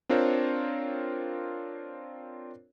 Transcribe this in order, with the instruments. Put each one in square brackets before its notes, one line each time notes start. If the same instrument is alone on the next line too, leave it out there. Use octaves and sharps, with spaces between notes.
[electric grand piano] C4 D4 F4 A#4 C5 C#5